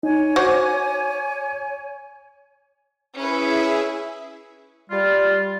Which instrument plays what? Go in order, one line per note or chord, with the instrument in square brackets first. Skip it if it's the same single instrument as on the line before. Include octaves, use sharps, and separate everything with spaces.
[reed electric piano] D#4 [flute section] C#5 G#5
[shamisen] F#4 C5 F#5 [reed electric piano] D6
[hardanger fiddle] C#4 B4 [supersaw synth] E4 G#4 E5
[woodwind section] G3 F4